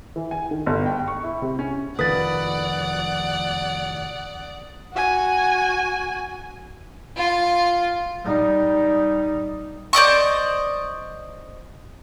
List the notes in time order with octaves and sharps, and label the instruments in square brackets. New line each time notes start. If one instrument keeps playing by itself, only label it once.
[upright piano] E3
G#5
D#3
G1
G5
C#6
E4
C3
C#4
[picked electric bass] F1 D#3 F3 [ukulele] B4 [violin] D5 F#5 [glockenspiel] D#6 A6
[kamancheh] F#4 G#5
[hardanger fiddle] F4 F5
[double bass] G3 D#4
[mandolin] C5 D5 D#5 C#6